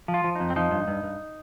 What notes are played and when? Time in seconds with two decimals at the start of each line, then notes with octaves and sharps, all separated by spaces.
0.08 F3
0.14 F4
0.24 F3
0.35 F2 D#4
0.50 C4
0.56 F3 D#4
0.71 G2
0.88 G2
1.03 G2